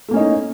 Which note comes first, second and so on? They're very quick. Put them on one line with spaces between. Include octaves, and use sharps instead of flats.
A3 A#3 C#4 D#5 D#4